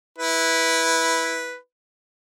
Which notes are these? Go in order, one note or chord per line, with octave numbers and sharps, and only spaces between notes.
E4 B4